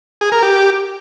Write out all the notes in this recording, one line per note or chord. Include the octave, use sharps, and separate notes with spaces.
G#4
A#4
G4